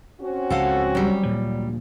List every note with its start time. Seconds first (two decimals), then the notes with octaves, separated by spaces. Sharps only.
0.21 C4 C#4 F#4
0.50 C#2 F3 G#3 A4 F5 F#5
0.95 F#3 G3
1.23 D2 A#2 F3